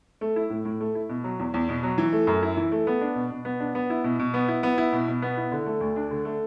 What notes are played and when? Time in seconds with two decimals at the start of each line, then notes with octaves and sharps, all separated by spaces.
0.21 A3
0.36 E4
0.50 A2
0.65 A2
0.80 A3
0.95 E4
1.09 B2
1.24 F#3
1.39 E2
1.54 E2
1.69 B2
1.83 F#3
1.98 E3
2.13 A3
2.27 F#2
2.43 E4
2.57 E3
2.72 A3
2.87 B3
3.01 D4
3.16 B2
3.31 B2
3.45 B3
3.60 D4
3.75 B3
3.90 E4
4.04 B2
4.19 B2
4.34 B3
4.48 E4
4.63 B3
4.78 E4
4.92 B2
5.08 B2
5.22 B3
5.37 E4
5.52 D3
5.66 A3
5.81 D2
5.96 D4
6.11 D3
6.25 A3